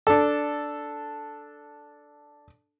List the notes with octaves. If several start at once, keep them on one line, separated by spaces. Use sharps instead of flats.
D4 A4